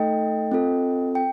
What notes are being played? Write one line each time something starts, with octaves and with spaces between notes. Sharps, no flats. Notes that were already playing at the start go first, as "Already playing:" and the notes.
Already playing: A3 D#4 A4 D#5 G5
C4 F4 A4
G5